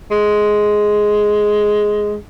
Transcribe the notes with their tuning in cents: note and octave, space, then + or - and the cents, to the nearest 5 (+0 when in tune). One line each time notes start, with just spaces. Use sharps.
G#3 +5